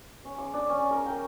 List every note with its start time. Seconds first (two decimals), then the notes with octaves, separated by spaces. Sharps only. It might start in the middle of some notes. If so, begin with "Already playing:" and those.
0.25 C#4
0.38 D6
0.54 D4
0.69 C#4
0.91 A#4
1.06 G5